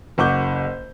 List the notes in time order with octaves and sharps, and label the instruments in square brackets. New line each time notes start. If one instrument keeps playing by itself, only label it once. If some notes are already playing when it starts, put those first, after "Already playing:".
[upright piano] F#1 F#5 C#6 D6 G6